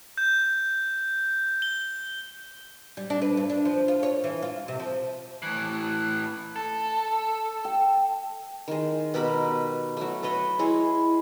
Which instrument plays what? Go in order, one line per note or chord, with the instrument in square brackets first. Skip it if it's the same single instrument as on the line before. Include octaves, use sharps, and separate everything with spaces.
[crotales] G6
G7
[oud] G3
D4
B4
G2
D4
F3
F4
C#5
E3
F4
C3
F3
[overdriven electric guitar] A2 E3
A4
[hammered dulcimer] G5
[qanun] D#3 G#3
B2 G4 A#4 B5
F#3 A3
A4 B4 C#5 D#5
G#3 E4 G#4 C#5